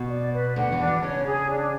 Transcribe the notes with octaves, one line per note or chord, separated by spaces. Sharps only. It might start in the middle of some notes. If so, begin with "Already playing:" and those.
Already playing: B2
D5
B4
D2 D3 F#5
E2 E3
D4
B2 B3
C#3 C#4 C#5
G#4
D4